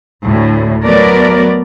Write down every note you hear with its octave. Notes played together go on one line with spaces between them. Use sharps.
D2 A2
F#3 A3 B3 A#4 D5